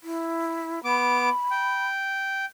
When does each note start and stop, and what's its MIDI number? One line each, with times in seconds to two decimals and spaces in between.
0.04 0.84 64
0.85 1.29 59
0.85 1.85 83
0.85 1.29 86
1.51 2.45 79